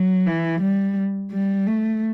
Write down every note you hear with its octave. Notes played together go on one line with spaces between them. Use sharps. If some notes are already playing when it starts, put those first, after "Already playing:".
Already playing: F#3
E3
G3
G3
A3